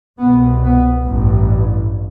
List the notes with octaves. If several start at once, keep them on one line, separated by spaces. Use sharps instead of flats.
C2 B2 B3
B3
A1 G2